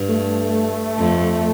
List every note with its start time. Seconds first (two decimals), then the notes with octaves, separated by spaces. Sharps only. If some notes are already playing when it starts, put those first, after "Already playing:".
Already playing: G2
0.09 A3
0.98 F2